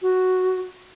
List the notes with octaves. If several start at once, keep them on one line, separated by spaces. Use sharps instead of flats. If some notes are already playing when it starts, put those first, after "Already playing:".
F#4